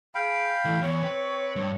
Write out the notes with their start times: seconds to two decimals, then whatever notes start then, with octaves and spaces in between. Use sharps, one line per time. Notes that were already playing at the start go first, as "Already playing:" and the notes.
0.15 G#4 F5 G5 B5
0.65 E3 A3 A4
0.81 E2 C#5
1.03 C4 B4
1.56 G2